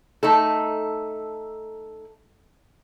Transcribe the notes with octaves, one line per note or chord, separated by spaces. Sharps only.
A3 D#4 A4